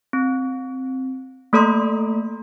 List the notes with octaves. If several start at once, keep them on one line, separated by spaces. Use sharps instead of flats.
C4
A3 A#3 A4 D5 A#5 C6